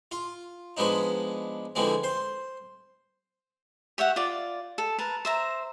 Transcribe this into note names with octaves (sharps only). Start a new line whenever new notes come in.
F4
F3 G#3 B3 D4 D#4
D3 E3 F3 G#3 C4
C5 C6
G4 C#5 E5 F#5
F4 D5
A4
A#4 B4 A5
C5 E5 A#5